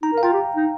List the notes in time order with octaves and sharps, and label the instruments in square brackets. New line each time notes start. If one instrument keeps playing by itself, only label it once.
[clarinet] D#4 [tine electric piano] A#5
[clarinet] A#4
[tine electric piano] F5
[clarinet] F4 [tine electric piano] G5
[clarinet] G4
D#4